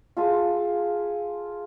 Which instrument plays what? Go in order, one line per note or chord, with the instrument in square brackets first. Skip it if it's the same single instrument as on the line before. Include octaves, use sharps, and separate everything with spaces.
[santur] F4 G#4 A4 E5